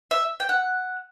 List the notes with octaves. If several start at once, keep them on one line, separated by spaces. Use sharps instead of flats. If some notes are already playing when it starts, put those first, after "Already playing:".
E5
G5
F#5